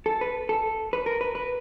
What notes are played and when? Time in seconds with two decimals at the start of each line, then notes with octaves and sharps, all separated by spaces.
0.06 A4
0.21 B4
0.49 A4
0.93 B4
1.06 A#4
1.21 B4
1.35 B4